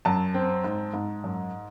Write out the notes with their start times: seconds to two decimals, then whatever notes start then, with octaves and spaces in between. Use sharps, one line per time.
0.05 F#2 A5
0.34 C4
0.64 G#2
0.94 G#2
1.24 F#2